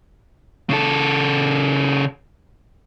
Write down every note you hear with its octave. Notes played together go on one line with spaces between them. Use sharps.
C#3 A4